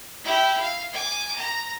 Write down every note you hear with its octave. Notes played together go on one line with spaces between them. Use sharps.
E4 G4
F5
G#5 D6
A#5